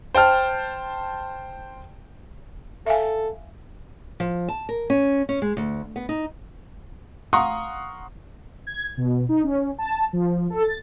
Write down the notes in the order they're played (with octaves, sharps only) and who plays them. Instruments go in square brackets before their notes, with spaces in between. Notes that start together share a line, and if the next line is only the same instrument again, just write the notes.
[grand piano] C5 G5 A5 F6
[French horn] A4 [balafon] E5 F5 G#5
[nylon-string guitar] F3
A5
A#4
C#4
C#4
G#3
D2
B3
D#4
[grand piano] F5 F#5 A#5 C6 C#6 D#6
[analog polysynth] G#6
B2
D#4
C#4
A5
F3
A4
A6